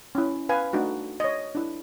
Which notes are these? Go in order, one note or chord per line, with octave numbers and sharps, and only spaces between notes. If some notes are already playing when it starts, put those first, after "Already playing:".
C#4 E4
B4 F5 G#5
A3 D4 D#4 F#4
C#5 D#5
D4 E4